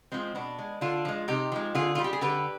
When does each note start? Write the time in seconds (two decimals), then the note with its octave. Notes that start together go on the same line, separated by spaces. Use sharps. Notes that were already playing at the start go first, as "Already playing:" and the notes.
0.12 F3 G#3 C4
0.35 B2 B3 D4
0.58 G#3
0.81 D3 D4 F4
1.05 F3 G#3
1.28 C3 D#4 G4
1.52 F3 G#3
1.75 D3 F4 G#4
1.95 G3 F4
2.04 G4
2.13 G#4
2.21 D3 G4 B4